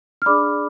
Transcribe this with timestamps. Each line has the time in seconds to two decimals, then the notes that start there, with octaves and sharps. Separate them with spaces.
0.22 F6
0.26 D4 G#4 D5 B5 D6